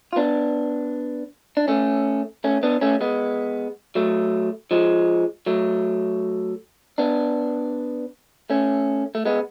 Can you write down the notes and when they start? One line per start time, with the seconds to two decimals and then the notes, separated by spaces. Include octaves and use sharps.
0.13 F4
0.16 B3 D4
1.57 D4
1.68 A3 C#4
2.44 A3 C#4
2.63 B3 D4
2.81 A3 C#4
3.01 G#3 B3
3.95 F#3 A3
4.71 F3 G#3
5.46 F#3 A3
6.98 B3 D4
8.50 A3 C#4
9.15 A3
9.26 G#3 B3